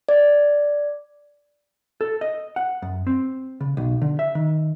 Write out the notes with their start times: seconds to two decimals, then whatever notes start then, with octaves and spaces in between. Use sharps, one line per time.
0.09 D5
2.01 A4
2.21 D#5
2.56 F#5
2.82 F#2
3.07 C4
3.61 C#3
3.77 B1
4.02 D3
4.19 E5
4.35 D#3